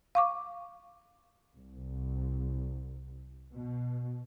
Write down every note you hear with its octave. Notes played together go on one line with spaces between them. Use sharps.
F5 C#6 D6
C2
B2